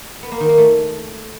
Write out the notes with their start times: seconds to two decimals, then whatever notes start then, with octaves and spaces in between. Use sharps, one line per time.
0.23 B3
0.31 A#3
0.40 D#3
0.49 A#3
0.58 A3